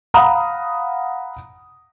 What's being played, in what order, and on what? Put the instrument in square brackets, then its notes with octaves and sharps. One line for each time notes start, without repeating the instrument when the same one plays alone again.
[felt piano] F5 F#5 A#5 B5 D#6